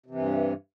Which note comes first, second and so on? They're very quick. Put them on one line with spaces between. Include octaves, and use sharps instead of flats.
C3 E3 G2